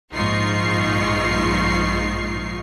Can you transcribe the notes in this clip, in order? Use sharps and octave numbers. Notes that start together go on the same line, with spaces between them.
A#1 G#2 D#4 F4 C#6 C7